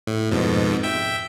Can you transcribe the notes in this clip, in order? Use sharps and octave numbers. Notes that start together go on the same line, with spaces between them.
A2
F2 G#2 B2
E5 G5